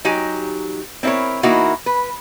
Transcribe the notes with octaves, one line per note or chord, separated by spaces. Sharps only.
F#3 D#4 G4 G#5
C4 D4 E4 A#4 C#5
E3 A#3 D#4 E4 F#4
B4